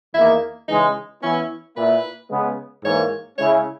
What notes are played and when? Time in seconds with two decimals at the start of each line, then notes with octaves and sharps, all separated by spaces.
0.14 E2 D#3 A#3 D#4 E4
0.68 C#3 E3 G#3 D#4
1.23 E3 B3 C#4 E4
1.76 A#2 A#3 E4 B4
2.31 C#3 G#3 B3
2.84 G#2 E3 A#3 C#5
3.38 C#3 G#3 C#4 E4 C#5